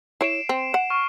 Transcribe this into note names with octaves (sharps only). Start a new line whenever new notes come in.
E4 C#5 C7 D7 E7
C4
F#5
C#6 F6